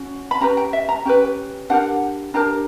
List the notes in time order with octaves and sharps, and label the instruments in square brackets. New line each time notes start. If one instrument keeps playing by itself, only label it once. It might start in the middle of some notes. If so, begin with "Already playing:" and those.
Already playing: [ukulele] C#4 F#4
B5
C#4 G4 B4 A#5
G5
E5
A#5
C#4 G4 B4 G5
D4 G4 A#4 F#5
D4 G4 A#4 A#5